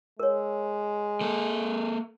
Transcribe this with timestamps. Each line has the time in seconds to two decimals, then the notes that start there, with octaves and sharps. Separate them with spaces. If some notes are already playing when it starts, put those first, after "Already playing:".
0.20 G#3 A#4 C#5
1.21 A#3 A4